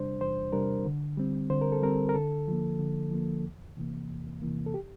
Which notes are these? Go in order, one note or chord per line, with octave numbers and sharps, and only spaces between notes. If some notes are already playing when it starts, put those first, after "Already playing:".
Already playing: E2 C3 G3 D4 C5
E2 C5
C3 G3 D4 A#4
D3
G3 C4
D3 C5
A#4
A4
G3 C4 A#4
A#4
D3 A4
F3 A#3
D3
F3 A#3
E2
C3 E3 A#3
E2
C3 E3 A#3
A4
G4